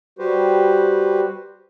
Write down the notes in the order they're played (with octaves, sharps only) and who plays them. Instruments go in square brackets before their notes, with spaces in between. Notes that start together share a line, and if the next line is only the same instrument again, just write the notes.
[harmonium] G3 F#4 G4 B4 C5